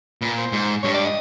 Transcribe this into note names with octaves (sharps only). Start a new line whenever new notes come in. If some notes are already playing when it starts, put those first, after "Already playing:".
A#2 B4
C5
G#2
G2 C#5
D5
D#5